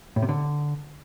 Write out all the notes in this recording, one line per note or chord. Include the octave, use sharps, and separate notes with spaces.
A2
C3
D3